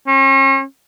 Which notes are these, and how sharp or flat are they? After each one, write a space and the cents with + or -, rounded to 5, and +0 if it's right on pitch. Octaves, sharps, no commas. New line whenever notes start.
C#4 -40